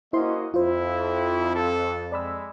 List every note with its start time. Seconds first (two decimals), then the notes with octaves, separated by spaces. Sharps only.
0.13 A#3 C#4 E4 F#4 C5 D#5 C6
0.54 F2 E4 F4 C5
1.56 A4
2.12 G#3 D5 B5 E6